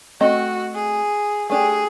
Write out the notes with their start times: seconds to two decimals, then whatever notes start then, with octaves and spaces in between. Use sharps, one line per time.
0.21 A3 C4 F#4 D#5
0.75 G#4
1.50 A3 D4 G4 G#4